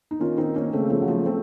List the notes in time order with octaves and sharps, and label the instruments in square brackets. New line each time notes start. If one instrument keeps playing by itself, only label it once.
[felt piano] D#4
[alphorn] D#3 [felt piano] C#4 F4
[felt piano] C4 D#4
A#3 C#4
[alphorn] C#3 [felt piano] A3 C4
[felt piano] F3 A3
F#3
F3 A3
A3 C4